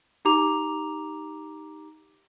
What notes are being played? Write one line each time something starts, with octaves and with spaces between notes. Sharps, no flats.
D#4 G4 A#5 D6 F7